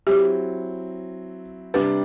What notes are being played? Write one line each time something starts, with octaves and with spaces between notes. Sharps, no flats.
F#3 C4 E4 G4
C3 G3 D4 B4